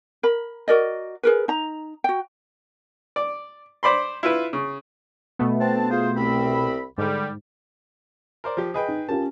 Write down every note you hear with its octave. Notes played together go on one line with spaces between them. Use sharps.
A#4 B5
F#4 A#4 D5 D#5
G#4 A#4 B4
D#4 A#5
F#4 G5
D5
C5 D5 B5 C6
E4 F4 B4
C#3
B2 A3 B3
C4 D4 A5
F4 G#4 C5
C2 C4 B5
G#2 D3 G3
A#4 C5 D5
F3 G4
G#4 B4 D#5 G5
D#4
C#4 F4 G4 A#4 A5